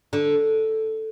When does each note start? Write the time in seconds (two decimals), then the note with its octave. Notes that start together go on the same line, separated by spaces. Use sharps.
0.13 D3